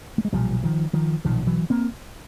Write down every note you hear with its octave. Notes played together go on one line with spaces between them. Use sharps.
A3
G#3
B1 A#2 F3 G3
D#3 F3
D#3 F3
B1 A#2 D#3 F3
E3 F#3
A#3 C4